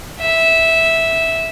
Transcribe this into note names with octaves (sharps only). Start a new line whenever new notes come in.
E5